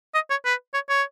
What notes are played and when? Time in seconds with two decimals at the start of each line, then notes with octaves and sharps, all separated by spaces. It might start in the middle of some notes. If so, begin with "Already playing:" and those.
0.14 D#5
0.30 C#5
0.45 B4
0.74 C#5
0.89 C#5